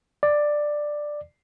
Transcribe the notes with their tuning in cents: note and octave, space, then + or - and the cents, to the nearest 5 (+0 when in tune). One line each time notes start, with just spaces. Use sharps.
D5 +10